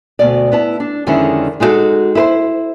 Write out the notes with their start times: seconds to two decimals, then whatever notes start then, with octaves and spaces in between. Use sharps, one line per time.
0.19 D2 B2 D5
0.52 B3 E4 A5
0.80 D4
1.06 F2 D3 D#3 G#3 C#4 E4
1.60 G#3 D#4 E4 F#4 A4
2.15 E4 B4 C5